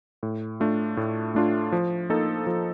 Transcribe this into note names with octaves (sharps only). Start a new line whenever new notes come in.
A2
A3 D4 F4
A2
A3 D4 F4
F3
A#3 D#4 A4
F3